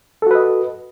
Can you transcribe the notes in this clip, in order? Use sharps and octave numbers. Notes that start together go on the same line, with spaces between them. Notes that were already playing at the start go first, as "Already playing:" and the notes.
F#4 A4 B4 D#5